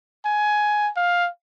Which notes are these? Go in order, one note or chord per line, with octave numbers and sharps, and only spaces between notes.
G#5
F5